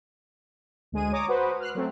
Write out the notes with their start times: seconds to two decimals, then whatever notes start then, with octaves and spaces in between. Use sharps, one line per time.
0.92 D2 G#3 G#4 D#7
1.12 C#5 A#5 D6 D#6
1.28 F#4 B4 C5
1.60 F6 F#6 C7
1.75 F#3 A3 C4